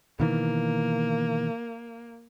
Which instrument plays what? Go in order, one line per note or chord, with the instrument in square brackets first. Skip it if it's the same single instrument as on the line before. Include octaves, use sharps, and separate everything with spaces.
[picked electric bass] B2 D#3 E3 [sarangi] A#3